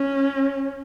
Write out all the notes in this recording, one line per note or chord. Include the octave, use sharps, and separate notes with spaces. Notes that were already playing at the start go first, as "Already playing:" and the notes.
Already playing: C#4